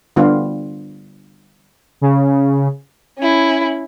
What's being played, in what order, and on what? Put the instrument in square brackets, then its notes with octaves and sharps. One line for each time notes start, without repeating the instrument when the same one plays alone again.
[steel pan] D3 G3 B3 F4
[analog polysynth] C#3
[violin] C#4 E4